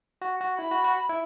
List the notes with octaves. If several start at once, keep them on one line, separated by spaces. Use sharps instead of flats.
F#4
F#4
E4 B5
F#4
F#4
E4